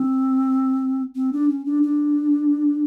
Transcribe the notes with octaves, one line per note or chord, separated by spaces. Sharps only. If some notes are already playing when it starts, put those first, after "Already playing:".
Already playing: C4
C4
D4
C#4
D4
D4